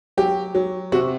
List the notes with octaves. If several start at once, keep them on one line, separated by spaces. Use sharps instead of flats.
F#3 G4
F#3
C3 F#4